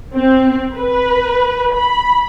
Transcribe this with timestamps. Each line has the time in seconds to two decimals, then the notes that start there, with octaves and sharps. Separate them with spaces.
0.14 C4
0.76 B4
1.76 B5